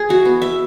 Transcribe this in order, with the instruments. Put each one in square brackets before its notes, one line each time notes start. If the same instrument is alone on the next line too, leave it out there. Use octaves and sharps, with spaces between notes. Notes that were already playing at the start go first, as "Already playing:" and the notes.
Already playing: [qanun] G#4
E3 F#4
B3
B3 E5